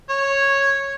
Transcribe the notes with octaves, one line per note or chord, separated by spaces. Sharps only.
C#5